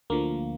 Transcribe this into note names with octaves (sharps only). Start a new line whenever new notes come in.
D2 D3 F3 A#3